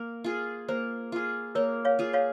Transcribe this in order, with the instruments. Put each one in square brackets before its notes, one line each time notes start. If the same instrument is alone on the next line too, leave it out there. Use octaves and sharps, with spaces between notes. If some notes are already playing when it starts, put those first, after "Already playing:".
Already playing: [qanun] A#3
F4 G#4
[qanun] A#3 [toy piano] C5
[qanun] F4 G#4
[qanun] A#3 [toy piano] A#4 C#5
[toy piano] C#5 F5
[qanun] F4 G#4
[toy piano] C#5 F5